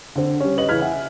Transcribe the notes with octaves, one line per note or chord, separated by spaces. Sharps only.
D3 C4
G3 C#4
B4 D#5 F#7
C#3 E3 B4 F6 G#6 B6
E5 F#5 G#5